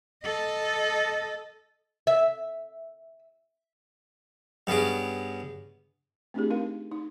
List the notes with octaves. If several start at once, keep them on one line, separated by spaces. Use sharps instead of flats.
A4 D#5
E5
G2 B3 C#4 G#4 D6
A3 C4 D4 F4 G4 G#4
C4 D#4 A#4 F5
D#4